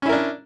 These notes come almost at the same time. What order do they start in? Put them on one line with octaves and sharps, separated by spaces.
C#4 E4 A#4 D4